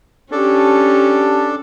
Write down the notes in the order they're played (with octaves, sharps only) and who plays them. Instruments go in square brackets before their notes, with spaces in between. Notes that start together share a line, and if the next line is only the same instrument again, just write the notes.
[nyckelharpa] C#4 G4 [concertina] D4 A4